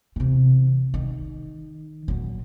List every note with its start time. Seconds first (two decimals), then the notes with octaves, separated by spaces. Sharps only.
0.16 C3 E3
0.94 D#3
2.08 A#2 F#3